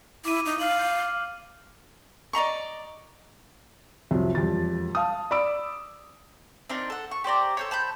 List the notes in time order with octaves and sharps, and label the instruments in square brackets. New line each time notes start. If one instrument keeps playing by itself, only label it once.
[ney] E4 [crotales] D6 D#7
[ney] D#4
[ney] F5 [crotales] F6 F#7
[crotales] G6
F6
[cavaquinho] D5 D#5 A#5 C#6
[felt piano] C2 F2 C3 F#3
E1 F2 G3 A6
F5 A5 D#6
D5 B5 D6 E6 D7
[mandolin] C4 D4 D#4 A#4
A4 F#5
C#6
G4 C5 D5 A#5
A4 C5 C#5
C5 A5 B5 G6